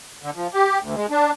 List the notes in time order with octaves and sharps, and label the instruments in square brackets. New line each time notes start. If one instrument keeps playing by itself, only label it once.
[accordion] D3
F3
G4
D2
G#3
D4